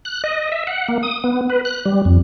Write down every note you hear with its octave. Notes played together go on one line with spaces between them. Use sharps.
F#6
D#5
E5
F#5
A#3
D#6
B3
B4
F#6
G3
F2